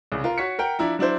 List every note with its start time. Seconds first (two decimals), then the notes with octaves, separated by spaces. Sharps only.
0.12 C2 C#3
0.24 F4 A#4
0.38 F#4 C#5 B6 C#7
0.59 A#4 F#5 G5
0.79 F3 D4 E4 A#5
0.99 F#3 D4 E4 C5